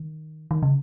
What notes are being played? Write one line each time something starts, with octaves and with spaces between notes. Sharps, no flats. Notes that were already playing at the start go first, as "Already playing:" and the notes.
Already playing: D#3
D#3
C#3